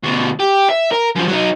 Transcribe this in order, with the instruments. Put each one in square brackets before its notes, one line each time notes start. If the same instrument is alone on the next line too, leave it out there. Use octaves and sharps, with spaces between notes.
[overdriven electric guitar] D2 B2
G4
E5
A#4
F#2 F3
F#3 D#4